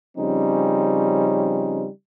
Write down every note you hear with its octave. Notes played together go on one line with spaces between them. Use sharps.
C#3 F3 G3 C4 C#4 D#4